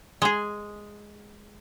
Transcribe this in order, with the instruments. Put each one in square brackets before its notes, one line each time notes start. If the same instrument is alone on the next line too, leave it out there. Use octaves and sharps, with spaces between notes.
[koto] G#3 G#4